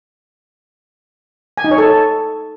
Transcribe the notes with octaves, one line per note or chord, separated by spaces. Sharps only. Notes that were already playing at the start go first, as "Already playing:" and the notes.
G#5
D#4
C#5
A4